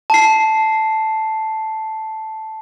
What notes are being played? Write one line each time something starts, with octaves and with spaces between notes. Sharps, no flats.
A5 C7